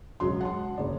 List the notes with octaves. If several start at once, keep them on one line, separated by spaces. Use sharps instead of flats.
E1 C#2 F#3 C6
F#5 A5 C6
F#1 A2 D5